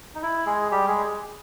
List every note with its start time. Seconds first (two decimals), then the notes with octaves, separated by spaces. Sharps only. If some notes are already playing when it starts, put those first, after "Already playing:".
0.15 D#4
0.22 E4
0.46 G#3 G#4
0.71 G3 G4
0.88 G#3 G#4